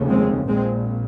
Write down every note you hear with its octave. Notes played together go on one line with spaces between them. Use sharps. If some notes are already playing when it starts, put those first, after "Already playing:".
Already playing: F1 D#2 C#3
G#3 C4
A#1 A#2 G#3 C4